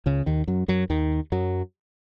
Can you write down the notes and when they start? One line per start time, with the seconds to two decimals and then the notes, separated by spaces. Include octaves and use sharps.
0.06 C#2 C#3
0.26 D#2 D#3
0.47 F#2 F#3
0.68 F#2 F#3
0.90 D#2 D#3
1.32 F#2 F#3